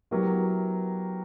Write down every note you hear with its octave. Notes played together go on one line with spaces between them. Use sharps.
F#3 B3 E4 G4 A#4